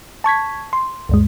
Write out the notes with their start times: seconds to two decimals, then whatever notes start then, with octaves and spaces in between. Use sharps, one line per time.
0.24 A5 C#6 G#6 B6
0.73 C6
1.09 D2 G2 G#3